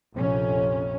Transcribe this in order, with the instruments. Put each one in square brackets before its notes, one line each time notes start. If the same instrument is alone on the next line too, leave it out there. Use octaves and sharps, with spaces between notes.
[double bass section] A#1 F2 C3 C#4